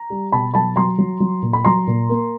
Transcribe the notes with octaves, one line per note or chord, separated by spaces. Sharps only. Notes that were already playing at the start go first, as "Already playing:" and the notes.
Already playing: A#5
G3
B2 A5 B5
F#3 A5 B5
F#3 A#5 C6
F#3
F#3
A#2
B5
F#3 A#5 C6
A#2
A#3